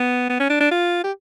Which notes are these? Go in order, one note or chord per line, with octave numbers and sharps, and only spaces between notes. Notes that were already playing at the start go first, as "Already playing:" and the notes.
Already playing: B3
B3
C#4
D4
D4
F4
G4